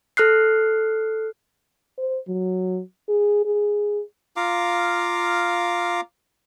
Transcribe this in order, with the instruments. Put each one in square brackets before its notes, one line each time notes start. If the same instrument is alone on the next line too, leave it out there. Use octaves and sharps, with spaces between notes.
[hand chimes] A4 F6 F#6 C7
[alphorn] C5
F#3
G#4
G#4
[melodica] F4 F5 A#5 D6